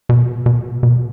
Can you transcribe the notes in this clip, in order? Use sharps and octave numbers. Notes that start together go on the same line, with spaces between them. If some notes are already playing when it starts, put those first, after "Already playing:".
B2
B2
B2